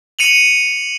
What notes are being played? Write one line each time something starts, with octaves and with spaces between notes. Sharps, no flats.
C#7 D#7 F7 F#7